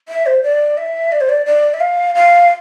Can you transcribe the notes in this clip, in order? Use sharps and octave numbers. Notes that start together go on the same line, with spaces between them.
E5
C5
D5
E5
D5
C5
D5
D5
E5
F5
F5